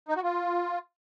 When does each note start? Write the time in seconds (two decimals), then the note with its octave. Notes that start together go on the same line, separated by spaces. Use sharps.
0.09 D#4
0.16 F#4
0.23 F4